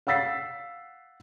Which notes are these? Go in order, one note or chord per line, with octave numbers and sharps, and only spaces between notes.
F5 F#5 E6 A6 B6 C7